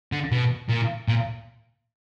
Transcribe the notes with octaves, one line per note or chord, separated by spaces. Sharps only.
D3
B2
A#2
A#2